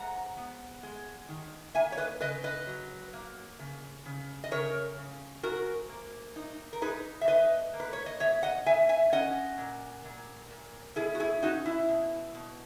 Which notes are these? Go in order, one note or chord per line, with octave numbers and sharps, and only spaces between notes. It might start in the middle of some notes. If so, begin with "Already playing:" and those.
Already playing: G#2 F#5 A#5
B3
G#3
D#3
A#3 E5 G#5
C#5
B4 D#5
C#3 B4 D#5
B4 D#5
F#3
A#3
C#3
C#3
D#5
C#3 A#4 C#5
C#3
G#2 F#4 A#4
A#3
D#4
A#4
D#4 G#4 B4
E5
B2 B4 D#5
A#3
B4
C#5
D#5
B2 C#5 E5
D#5 F#5
B2 E5 G#5
E5 G#5
C#4 D#5 F#5
A#2
A#2
A#2
B2 E4 G#4
F#4
E4 G#4
C#4 D#4 F#4
E4
B2
B2